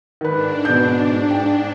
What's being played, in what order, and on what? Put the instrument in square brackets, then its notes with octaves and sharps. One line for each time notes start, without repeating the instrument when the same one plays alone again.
[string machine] G#2 D4 [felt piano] D#3 B4
[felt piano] B2 B3 G6
G5